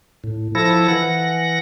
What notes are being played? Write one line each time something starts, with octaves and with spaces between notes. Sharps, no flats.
A2
F3 E4 A4 A#6
E3 F#5 A#6